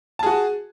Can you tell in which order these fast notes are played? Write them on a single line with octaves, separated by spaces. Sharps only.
A5 G#4 F#4